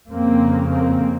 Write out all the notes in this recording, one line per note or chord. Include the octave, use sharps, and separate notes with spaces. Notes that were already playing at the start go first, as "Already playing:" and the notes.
F2 C#3 A#3 C4
A#3 C4